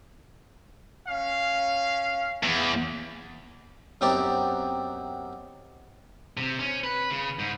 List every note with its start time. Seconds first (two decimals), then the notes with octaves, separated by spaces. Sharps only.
1.08 C#4 F5
2.43 E2
4.01 F#2 B3 C4 D#4 G4 D5
6.37 C3
6.59 C#4
6.84 B4
7.11 C#3
7.39 G#2